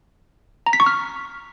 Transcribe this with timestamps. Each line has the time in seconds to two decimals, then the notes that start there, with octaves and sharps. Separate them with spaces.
0.66 A#5
0.73 B6
0.80 C#6
0.86 F6